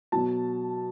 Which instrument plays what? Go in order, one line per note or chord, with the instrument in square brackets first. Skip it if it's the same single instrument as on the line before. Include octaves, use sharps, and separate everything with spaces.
[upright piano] B2 F#3 A5